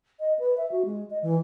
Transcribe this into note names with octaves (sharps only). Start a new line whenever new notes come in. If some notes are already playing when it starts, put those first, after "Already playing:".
D#5
B4
E5
F#4
G#3
D#5
E3